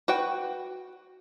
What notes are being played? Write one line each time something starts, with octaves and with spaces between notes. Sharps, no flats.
F#4 B4 G5